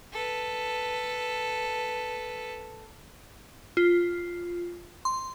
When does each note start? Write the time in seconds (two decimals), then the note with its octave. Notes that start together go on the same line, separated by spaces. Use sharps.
0.13 A4 B4
3.77 F4
5.05 C6